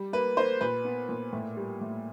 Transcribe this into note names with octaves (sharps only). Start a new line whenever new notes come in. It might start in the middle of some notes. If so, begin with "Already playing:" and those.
Already playing: G3
A#3 B4
A#3 C5
A#2 B4
B3
A#2
A2
G3
A2